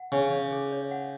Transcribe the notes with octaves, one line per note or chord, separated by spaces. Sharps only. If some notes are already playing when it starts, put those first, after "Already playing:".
Already playing: F#5
C#3 C#5
C#5
G#4
C#5
F#5